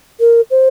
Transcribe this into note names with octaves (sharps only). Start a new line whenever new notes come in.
A#4
C5